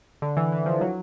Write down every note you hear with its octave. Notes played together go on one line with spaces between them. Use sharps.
D3
E3
E3
F3
F#3